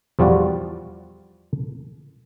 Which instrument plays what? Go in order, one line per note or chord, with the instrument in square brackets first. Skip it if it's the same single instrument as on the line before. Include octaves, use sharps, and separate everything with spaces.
[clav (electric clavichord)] E2 F3 G3 F4 F#4 D5